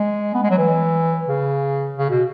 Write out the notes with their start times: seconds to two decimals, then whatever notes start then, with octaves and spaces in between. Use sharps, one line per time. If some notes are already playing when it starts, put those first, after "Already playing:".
Already playing: G#3
0.35 B3
0.43 G#3
0.50 F#3
0.58 E3
1.28 C#3
1.98 C#3
2.10 B2